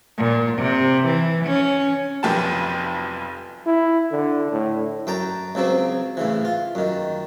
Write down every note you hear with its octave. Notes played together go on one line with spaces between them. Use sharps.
A#2
C3
E3
C#4
F1 B1 F2 G4 A5
E4
D3
A2
F#2 G5 A5 A#5
C#2 C#3 F#3 C4
A2 C#3 E3
F4
F#2 D#3